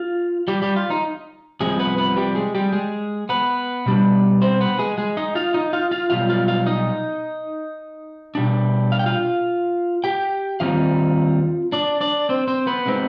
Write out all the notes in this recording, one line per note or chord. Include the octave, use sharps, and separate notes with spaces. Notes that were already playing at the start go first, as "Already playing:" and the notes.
Already playing: F4 F5
G3 G4
G3 G4
F4
D#4
C2 C3 F3 G#3 G#4
B3 B4
B3 B4
G3 G4
G#3 G#4
G3 G4
G#3 G#4
B3 B4
B2 G3 D4
C4 C5
B3 B4
G#3 G#4
G#3 G#4
D#4 D#5
F4 F5
D#4 D#5
F4 F5
F4 F5
B1 B2 G3 F4 F5
F4 F5
F4 F5
D#4 D#5
B2 G3 D4
F5
G5
F4 F5
G4 G5
D#2 D#3 G3 C4 D#4 F4 F5
D4 D5
D4 D5
C4 C5
C4 C5
B3 B4
D3 G#3 C4 D#4